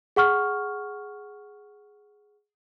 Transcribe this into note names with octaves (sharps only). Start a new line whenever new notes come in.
G#4 F#5 C#6 F6